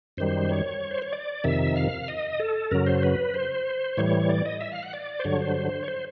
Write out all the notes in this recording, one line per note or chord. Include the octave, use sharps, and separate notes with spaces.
F#2 D#3 G3 C5
C#5
C5
C#5
D5
F2 C3 D#3 E5
F5
D#5
A4
F#2 C#3 F#3 A#4
C5
B4
C5
A2 E3 G3 C#5
D5
D#5
E5
F5
F#5
D5
C5
G2 D3 F#3 C#5
C5
C#5
C5